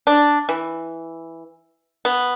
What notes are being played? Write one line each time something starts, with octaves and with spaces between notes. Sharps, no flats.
D4
E3
B3